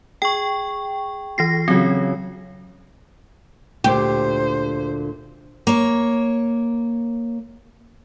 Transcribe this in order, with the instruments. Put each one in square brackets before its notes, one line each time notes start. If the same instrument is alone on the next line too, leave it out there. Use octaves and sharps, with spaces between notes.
[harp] G#4 [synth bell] G5 C#6
[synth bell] E3 A#6 C7 [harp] F4
[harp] C#3 F#3 [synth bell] C4
[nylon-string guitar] D2 A#2 [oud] G4 [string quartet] C5
[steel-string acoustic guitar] A#3 C#5